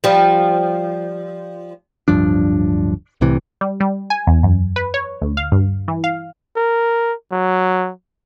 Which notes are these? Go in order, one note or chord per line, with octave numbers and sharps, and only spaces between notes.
F3 G3
D1 G2 F3 D4
C2 A2 C3 E3
G3
G3
G#5
E2
F#2
B4
C#5
D2
F5
G2
E3
F5
A#4
F#3